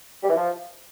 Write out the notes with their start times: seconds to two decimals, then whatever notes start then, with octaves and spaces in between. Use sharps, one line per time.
0.23 G3
0.30 E3
0.36 F3